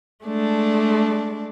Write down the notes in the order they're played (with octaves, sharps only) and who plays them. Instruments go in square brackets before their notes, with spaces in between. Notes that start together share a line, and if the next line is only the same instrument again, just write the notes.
[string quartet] G#3 A3 D4 D5